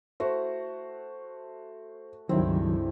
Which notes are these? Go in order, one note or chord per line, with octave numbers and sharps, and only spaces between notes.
A3 F#4 C5
C#2 G2 D#3 F#3 C4 E4